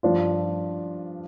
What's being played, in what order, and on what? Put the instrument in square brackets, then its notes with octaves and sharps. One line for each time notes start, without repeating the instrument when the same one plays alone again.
[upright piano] G2 F3 D4 F4